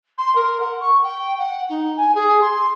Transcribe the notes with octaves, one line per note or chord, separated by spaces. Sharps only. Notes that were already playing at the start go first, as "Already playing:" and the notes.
C6
A#4
F#5
C#6
G5
F#5
D#4
G#5
G#4
C6